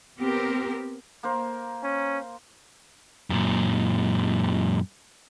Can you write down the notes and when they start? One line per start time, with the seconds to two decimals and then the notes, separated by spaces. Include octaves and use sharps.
0.18 B3 C4 G4 A#4
1.23 A#3 A#4 C5
1.83 C#4
3.30 F#2 A#2